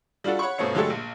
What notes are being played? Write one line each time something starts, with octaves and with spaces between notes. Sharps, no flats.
G3 D4 F4 F#4 A4
C#5 F#5 B5 C#6
G1 B2 A3 C4 C#5 C#7
D3 F#3 G#3 A3 G4 A4
A#1